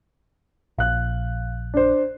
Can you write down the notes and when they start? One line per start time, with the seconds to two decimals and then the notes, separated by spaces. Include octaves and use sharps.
0.78 A#1 F5 F#6
1.74 D4 C5